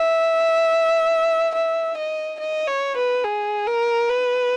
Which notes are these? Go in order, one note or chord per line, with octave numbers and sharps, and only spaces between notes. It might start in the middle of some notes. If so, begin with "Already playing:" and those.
Already playing: E5
E5
D#5
D#5
C#5
B4
G#4
A#4
B4